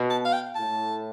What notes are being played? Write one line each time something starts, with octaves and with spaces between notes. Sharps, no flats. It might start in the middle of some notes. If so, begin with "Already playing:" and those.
Already playing: B2
A5
F5
G5
A2 A5